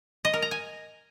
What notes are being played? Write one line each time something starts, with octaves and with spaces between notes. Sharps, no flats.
D#5
A#4
A#5
G#5